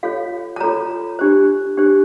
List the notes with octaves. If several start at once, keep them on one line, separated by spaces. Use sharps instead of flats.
F4 A4 C#5 F5
A5
F4 A4 C#5 A#5
D4 G4 C5
D4 G4 C5